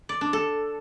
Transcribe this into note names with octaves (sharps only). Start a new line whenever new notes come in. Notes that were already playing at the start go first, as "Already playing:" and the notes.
D5
D4
A4